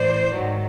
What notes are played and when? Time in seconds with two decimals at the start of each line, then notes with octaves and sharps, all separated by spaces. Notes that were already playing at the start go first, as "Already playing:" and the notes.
Already playing: A2 E3 C5 D5
0.35 G#2 D#3 F#3